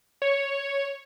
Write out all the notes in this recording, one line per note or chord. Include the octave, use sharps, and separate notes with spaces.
C#5